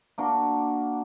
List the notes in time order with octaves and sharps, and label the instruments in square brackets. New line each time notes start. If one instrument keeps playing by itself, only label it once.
[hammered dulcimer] A#3 D4 F#4